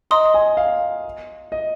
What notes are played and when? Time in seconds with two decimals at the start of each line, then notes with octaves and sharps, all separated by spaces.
0.11 D#5 A#5 C6 D#6
0.34 G#5
0.57 F5
1.52 D#5